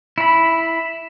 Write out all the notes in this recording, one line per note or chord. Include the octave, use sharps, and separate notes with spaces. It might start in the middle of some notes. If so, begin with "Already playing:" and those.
E4 B5